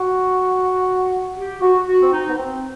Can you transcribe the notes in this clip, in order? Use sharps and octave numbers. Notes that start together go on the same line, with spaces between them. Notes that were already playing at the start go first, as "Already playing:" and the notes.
Already playing: F#4
G4
F#4
F#4
C4
D#4
B3
C4